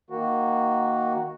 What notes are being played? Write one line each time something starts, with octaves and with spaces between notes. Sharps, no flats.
D#3 A#3 F#4